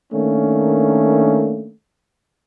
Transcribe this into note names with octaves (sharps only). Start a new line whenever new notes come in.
D#3 A3 A#3 C#4 D4